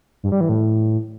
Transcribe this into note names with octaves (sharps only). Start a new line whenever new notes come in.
G2
G3
E3
A2